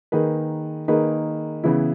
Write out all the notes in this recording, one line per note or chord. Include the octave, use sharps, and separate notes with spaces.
D#3 A#3 D#4 G#4 B4
D#3 A#3 D#4 G#4 B4
C#3 E3 B3 E4